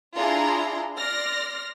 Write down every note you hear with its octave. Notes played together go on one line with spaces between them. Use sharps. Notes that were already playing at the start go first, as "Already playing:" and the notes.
D4 E4 F4 G#4 A#5 C6
D5 C6 F6 A#6